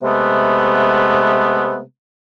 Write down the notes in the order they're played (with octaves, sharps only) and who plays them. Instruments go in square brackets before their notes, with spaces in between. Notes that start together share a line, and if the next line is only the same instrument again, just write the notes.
[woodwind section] C3 G#3 A3 B3